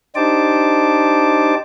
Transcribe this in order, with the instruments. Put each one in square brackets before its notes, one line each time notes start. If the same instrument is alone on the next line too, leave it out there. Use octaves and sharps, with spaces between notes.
[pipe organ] D4 D#4 G4 C5 A5 D6